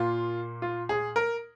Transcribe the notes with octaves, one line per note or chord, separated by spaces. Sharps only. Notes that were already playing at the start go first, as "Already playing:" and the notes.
Already playing: A#2 A#3 F4
F4
G#4
A#4